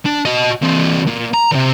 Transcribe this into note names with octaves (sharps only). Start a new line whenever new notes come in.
D4
F#4 D#5
E3 C4
A#2
A#5
E2 C3